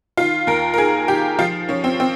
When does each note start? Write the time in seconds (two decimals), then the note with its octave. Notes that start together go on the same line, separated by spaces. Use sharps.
0.17 D#3 F4
0.47 D#2 A#4
0.74 A#4
0.78 D#3 G#4
1.08 D#3 G4
1.39 F3 F4
1.69 F3 C#4
1.84 C4
2.00 C4